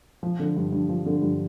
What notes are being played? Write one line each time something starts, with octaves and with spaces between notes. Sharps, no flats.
F3
D3
G2
G2
F3
D3
G2